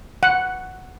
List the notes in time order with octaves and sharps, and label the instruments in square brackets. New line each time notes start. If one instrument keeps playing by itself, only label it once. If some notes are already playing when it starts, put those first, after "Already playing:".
[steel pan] F#5